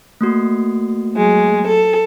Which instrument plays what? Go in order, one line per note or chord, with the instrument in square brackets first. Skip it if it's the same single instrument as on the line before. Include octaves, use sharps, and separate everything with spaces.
[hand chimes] A3 A#3 F#4
[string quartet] F#3 G#3
A4